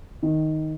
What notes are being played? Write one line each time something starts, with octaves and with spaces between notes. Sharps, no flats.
D#3